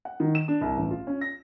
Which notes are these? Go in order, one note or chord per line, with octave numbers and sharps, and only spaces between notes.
F#5
D#3
E7
D4
C2
A1
F4
C#4
A#6